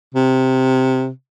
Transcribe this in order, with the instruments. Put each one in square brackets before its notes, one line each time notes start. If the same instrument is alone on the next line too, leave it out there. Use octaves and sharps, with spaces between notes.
[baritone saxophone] C3